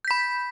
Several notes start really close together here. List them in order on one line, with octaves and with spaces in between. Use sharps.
G6 B6 B5